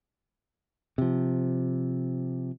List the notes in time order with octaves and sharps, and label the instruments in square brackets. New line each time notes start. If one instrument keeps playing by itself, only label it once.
[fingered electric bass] C3 F3